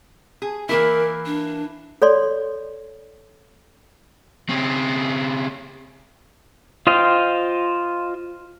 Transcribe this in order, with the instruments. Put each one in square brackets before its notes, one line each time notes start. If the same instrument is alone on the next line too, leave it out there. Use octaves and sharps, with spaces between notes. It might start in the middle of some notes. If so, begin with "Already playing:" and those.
[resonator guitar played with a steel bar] G#4
[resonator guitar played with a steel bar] E3 A#3 E4 [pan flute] A#4
[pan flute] D4
[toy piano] A4 C#5 D5 C6
[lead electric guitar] C#3 C4
[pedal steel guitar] F4 C5 D#5 F5 G5